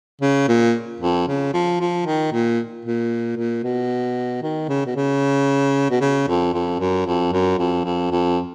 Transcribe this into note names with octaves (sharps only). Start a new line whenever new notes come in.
C#3
A#2
F2
C#3
F3
F3
D#3
A#2
A#2
A#2
B2
D#3
C#3
B2
C#3
B2
C#3
F2
F2
F#2
F2
F#2
F2
F2
F2